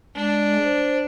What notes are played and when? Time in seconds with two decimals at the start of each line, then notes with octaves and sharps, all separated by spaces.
0.16 G#3 D4
0.64 C5